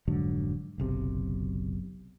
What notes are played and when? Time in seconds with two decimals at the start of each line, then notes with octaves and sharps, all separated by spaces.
0.08 F1 G#2 D3 F#3
0.78 F#1 B1 C3